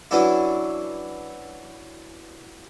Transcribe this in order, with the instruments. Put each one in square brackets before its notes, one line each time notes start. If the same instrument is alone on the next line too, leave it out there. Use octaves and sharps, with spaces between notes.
[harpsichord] E3 F#3 C#4 D4 E4